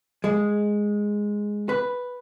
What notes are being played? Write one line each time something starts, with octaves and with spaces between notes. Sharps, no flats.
G#3
B4